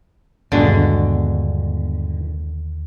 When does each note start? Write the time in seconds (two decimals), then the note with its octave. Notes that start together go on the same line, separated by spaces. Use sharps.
0.52 G1 D#2 B2 D3 G#3 F#4